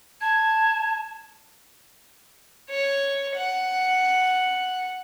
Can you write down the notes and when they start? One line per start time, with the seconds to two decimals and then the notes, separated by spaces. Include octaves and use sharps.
0.21 A5 G#6
2.70 C#5
3.36 F#5